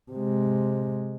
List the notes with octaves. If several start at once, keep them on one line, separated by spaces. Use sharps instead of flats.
C3 G#3